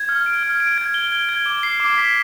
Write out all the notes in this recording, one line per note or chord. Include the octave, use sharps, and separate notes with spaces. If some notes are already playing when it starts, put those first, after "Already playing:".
Already playing: G#6
F6
D7
F6
D7
G#6
G7
G#6
G#6
D6
C7
D6
B6